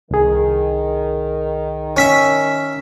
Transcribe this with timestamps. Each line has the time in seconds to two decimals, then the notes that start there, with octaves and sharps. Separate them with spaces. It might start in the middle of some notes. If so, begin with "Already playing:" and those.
0.11 C2 D#3 G#4
1.97 C#4 E5 C#6 B6